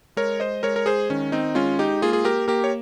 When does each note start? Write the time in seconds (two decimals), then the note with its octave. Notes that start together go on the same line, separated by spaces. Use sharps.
0.17 G#3 A#4 C#5
0.40 C5 D#5
0.63 G#3 A#4 C#5
0.76 A#4
0.86 G#4 C5
1.10 D#3 C#4
1.32 C4 D#4
1.55 G#3 C#4 F4
1.79 D#4 G4
2.02 A#3 F4 G#4
2.13 G#4
2.25 G4 A#4
2.47 A#3 G4 A#4
2.64 C#5